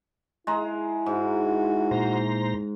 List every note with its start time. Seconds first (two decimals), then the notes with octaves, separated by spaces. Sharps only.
0.47 G#3 E4 A#5
1.06 G#2 F#4
1.91 A#2 C5 A#5